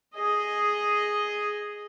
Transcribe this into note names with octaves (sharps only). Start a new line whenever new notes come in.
G#4 D#5